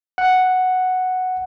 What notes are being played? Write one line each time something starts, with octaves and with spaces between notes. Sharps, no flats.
F#5